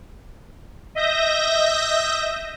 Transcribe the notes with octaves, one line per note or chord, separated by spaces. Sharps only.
D#5 E5 G6 A#6